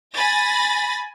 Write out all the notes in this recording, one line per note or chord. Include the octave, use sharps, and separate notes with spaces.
G#5 B5 A6 A#6